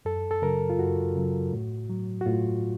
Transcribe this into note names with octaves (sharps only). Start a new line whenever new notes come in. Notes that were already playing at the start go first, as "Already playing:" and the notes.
F#2 A4
A4
C#3 F#3 A#4
F4
F#2 F#4
C#3 F#3
A2
F#3
F#4
A2 F4